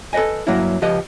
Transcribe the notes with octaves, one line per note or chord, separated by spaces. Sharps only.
A4 B4 C5 D#5 G#5
G2 F#3 A#3 C#4 E4
C#2 F3 G4 B4 D#5